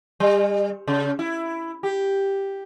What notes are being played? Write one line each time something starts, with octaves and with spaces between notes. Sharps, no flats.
G3
C#3
E4
G4